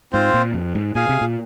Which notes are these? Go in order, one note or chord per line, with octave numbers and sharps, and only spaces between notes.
G#2 C4 F4 C5
A#2
F2
G#2
A#2 G#4 F5 G#5
C3
A#2